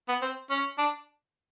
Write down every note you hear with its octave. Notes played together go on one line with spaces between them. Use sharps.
B3
C4
C#4
D4